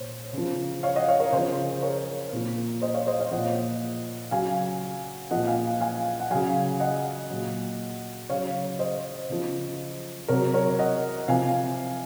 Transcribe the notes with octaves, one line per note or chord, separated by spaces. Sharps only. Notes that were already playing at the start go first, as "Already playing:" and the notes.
Already playing: A#2 C5 C#5
C#3 F3
C#5 F5
D#5 F#5
C#5 F5
A#4 C#5
C#3 F3 G#4 C5
A#4 C#5
A#2 F3
C5 D#5
C#5 F5
C5 D#5
C#5 F5
F3 D#5 F#5
A#2
C#3 F#3 F5 G#5
A#2 F3 D#5 F#5
F5 G#5
F5 G#5
F#5
C#3 F#3 F5 G#5
D#5 F#5
A#2 F#3
C#3 F#3 C#5 F5
C5 D#5
C#3 F3
C3 F#3 A#4 C#5
A#4 C#5
D#5 F#5
C3 F3 F5 G#5